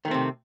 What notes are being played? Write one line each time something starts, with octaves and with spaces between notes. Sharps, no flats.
C3 D#3 A3 C4